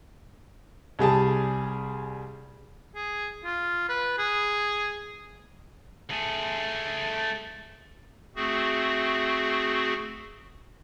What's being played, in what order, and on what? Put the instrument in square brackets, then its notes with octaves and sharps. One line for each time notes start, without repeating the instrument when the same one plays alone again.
[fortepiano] C2 G3 G#4 A5
[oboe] G#4
F4
B4
G#4
[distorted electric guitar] A3 G#4
[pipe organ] A3 C4 F#4 G#4